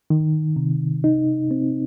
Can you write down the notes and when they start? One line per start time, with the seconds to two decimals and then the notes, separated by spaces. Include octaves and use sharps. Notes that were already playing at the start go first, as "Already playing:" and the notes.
0.10 D#3
0.56 C3
1.04 D#4
1.51 C4